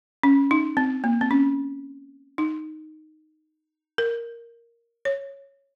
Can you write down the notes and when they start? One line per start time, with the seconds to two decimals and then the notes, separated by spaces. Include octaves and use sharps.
0.23 C#4
0.51 D#4
0.77 C4
1.04 A#3
1.21 C4
1.31 C#4
2.38 D#4
3.98 A#4
5.05 C#5